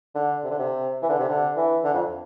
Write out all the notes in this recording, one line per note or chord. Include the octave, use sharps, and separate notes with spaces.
D3
C3
D3
C3
E3
D3
C3
D3
E3
D3
F2